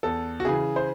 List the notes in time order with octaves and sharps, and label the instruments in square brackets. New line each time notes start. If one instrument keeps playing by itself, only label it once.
[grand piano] E2 A4
F#4
C#3 E3 G#4
C5